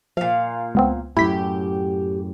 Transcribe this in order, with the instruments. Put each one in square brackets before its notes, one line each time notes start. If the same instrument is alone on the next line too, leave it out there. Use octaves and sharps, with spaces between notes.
[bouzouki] A#2 F5 [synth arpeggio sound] F3
[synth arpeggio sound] C#2 B3 C4
[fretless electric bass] F#2 A2 [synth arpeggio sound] E4 B6 [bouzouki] G4